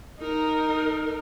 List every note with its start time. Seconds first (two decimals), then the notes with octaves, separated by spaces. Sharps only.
0.20 D#4 A#4